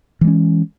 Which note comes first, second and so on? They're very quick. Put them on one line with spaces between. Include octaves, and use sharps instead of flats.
E3 G#3 C#4